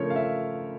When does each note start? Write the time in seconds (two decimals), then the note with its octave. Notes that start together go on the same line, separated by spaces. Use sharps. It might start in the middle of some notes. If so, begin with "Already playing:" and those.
Already playing: C#3 F3 A3 A#4 C#5
0.10 F5
0.16 E5